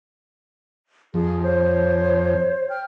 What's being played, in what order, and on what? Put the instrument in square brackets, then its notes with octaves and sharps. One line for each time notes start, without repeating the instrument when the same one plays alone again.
[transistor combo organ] F2 [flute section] G#4
[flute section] C5 C#5
G5 F6